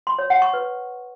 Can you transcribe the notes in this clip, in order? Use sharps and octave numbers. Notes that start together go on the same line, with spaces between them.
C6
C#5
F#5
C#6
B4